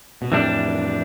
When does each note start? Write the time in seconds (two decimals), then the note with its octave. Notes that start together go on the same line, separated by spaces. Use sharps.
0.22 B2
0.31 F2 A2 E3 G3 D4